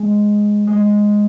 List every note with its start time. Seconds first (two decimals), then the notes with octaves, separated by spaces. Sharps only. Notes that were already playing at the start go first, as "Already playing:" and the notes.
Already playing: G#3
0.67 G#3